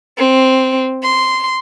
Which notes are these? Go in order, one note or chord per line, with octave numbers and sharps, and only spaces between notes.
C4
C6